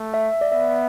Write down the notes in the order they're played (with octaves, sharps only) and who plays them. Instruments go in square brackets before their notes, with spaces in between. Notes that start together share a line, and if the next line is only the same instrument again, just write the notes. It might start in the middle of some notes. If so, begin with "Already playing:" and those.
Already playing: [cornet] A3
[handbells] E5
D5
[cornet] B3 [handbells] E5